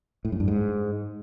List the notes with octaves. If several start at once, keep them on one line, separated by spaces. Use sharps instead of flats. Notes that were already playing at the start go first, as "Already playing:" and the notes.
A2
F#2
G2
G#2